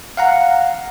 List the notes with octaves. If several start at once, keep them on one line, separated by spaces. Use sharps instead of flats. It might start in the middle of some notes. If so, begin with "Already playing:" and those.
F5 F#5 A#5